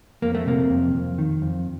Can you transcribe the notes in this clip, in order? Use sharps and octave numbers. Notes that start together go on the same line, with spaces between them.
F2 A#3
A3
C3 A#3
F2
F2
D#3
F2